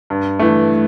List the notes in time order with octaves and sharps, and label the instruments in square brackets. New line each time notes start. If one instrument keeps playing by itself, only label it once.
[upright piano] G2
E3 A3